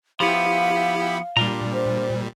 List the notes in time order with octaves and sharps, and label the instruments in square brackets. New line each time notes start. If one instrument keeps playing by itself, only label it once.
[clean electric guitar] F3 B3 [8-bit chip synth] E4 G4 B5 [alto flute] F5
[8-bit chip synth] A#2 G3 [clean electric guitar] D4 F4 A#5
[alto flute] C5